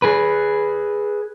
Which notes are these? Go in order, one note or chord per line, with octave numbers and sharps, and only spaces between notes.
G#4 B4